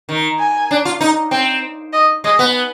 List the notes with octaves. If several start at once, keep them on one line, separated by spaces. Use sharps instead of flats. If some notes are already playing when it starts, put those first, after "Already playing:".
D#3
G#5
D4
F4
D#4
C4 G5
D#5
G#3 D#5
B3